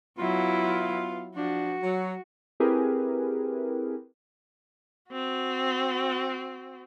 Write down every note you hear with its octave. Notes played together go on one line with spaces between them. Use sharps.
F#3 B3 E4 F4
F3 D4 F#4
F#3
C4 E4 G4 G#4 A#4 B4
C4 F#4